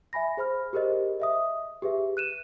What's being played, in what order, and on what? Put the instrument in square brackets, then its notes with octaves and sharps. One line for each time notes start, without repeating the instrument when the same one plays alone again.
[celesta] E5 G#5 B5 A#6
G#4 C5 B5 F6
G4 G#4 A#4 C5 D#5
D#5 E5 D#6
G4 G#4 B4 E5
F#6 D#7 E7